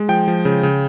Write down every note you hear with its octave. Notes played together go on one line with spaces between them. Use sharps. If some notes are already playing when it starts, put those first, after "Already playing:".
Already playing: G#3
F3 G5
F3
C#3
C#3